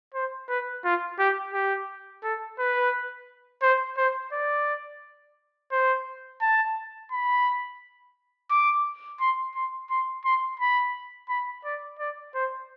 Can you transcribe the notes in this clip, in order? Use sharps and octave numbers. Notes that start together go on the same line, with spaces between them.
C5
B4
F4
G4
G4
A4
B4
C5
C5
D5
C5
A5
B5
D6
C6
C6
C6
C6
B5
B5
D5
D5
C5